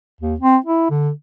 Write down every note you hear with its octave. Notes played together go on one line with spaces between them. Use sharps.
D#2
C4
E4
D3